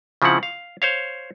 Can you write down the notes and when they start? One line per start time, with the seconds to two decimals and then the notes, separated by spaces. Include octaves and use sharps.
0.22 C#3 F3 C4 E4 F#5
0.43 F5
0.82 C5 C#5 F5